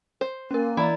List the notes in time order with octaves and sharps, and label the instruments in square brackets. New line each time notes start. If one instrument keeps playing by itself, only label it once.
[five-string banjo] C5
[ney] A#3 [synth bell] C#4 A#4
[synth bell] E3 A#5 B5 [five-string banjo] E4 [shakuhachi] D5